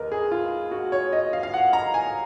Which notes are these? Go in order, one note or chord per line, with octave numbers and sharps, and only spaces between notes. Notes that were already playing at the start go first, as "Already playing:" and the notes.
Already playing: D#2 A#4 B4 D#5
G#4
F4
F#4
C#5
D#5
F5
F5
F#5
A#5
G#5